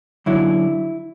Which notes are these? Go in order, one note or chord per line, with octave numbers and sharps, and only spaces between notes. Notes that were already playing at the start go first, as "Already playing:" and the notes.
F#2 D3 F#3 E4